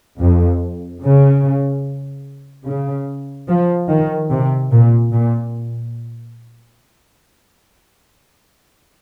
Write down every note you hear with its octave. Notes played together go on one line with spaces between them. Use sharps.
F2
C#3
C#3
F3
D#3
C3
A#2
A#2